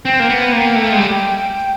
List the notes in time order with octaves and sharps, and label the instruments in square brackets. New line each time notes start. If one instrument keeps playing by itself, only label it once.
[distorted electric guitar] C4 [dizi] G5
[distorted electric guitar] A#3
B3
A#3
A3
G#3
G3